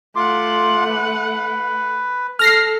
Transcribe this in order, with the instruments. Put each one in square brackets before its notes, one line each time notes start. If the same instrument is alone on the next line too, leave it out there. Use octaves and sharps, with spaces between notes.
[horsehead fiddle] A3 F#5 [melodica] F4 C6 D6
[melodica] B4
[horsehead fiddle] A4 [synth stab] F6 A#6 C7